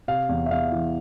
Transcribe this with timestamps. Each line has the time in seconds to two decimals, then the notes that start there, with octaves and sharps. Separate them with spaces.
0.08 C3 F5
0.29 E2
0.46 E5
0.51 E2 F5
0.72 E3